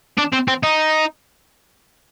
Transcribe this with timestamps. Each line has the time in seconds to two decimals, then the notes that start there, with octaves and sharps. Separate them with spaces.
0.18 D4
0.32 C4
0.48 C4
0.63 D#4